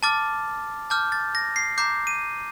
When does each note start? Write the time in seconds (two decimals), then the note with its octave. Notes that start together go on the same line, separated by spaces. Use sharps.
0.03 A5 D6 F6 A6
0.90 A5 D6 F6 G6
1.12 A6
1.35 A#6
1.56 C7
1.78 A#5 D6 G6 C7
2.07 D#7